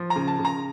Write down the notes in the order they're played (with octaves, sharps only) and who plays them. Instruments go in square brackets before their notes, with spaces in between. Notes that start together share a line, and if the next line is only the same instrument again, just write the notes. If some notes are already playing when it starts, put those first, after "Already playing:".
Already playing: [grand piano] F3
A#5
C#3
A5
C#3
A#5